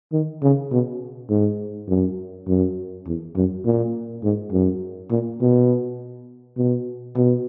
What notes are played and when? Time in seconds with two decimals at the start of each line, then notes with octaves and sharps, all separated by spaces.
0.12 D#3
0.43 C#3
0.71 B2
1.30 G#2
1.88 F#2
2.47 F#2
3.06 E2
3.36 F#2
3.65 A#2
4.23 G#2
4.52 F#2
5.11 A#2
5.41 B2
6.57 B2
7.16 B2